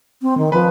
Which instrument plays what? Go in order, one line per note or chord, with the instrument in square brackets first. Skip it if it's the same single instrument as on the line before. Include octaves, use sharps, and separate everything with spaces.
[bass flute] C4
D#3
[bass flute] F3 [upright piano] B4